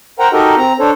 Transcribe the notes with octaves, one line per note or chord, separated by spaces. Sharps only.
A#4 C5 F#5 G5 A#5
D#4 F#4 G4 A4 A#4 D#5
C4 A#5
D4 A4 C5 C#5